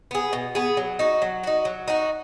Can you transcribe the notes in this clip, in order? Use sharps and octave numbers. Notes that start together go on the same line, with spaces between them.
B3 G#4
B2
B3 G#4
F#3
D#4 F#4
F#3
D#4 F#4
F#3
D#4 F#4